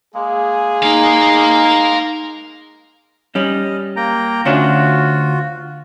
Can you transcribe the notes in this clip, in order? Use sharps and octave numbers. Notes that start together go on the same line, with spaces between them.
G#3 A#3 G#4
D#4 A#4 F5
G3 C#4 D#5
A#3 G5 A#5
D2 C#4 D4 F4 F#4